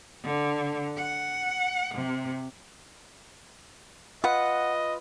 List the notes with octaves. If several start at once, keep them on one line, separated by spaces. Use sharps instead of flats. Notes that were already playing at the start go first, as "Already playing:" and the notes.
D3
F#5
C3
F4 B4 D#5 F#5